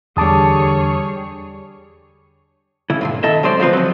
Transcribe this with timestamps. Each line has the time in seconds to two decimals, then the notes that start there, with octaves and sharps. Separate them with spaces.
0.17 E2 D3 G3 G#4 C#5 A5 D6 D#6
2.90 C#3 E4
3.01 C2 G2 A#2
3.23 D#3 A4 D#5 E5
3.43 C3 F#3 G#3 C5 D5
3.60 D2 F3 C4 F4 A#4 B4
3.73 F3 F#3